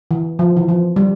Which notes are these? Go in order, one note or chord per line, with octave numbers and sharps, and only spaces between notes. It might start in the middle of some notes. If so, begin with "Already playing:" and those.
E3
F3
E3
F3
G3